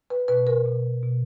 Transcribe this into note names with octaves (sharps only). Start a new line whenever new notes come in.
B4
B2 B4
A#4
B2
B2